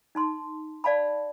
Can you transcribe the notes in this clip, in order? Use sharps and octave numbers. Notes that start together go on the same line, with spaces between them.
D#4 A5 C6
D5 F5 A5 B5